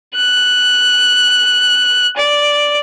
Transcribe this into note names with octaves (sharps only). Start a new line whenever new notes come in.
F#6
D5